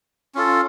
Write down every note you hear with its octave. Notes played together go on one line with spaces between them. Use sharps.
C#4 F4 A4